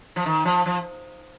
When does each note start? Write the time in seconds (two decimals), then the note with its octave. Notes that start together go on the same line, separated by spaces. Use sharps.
0.16 F3
0.26 D#3
0.45 F3
0.66 F3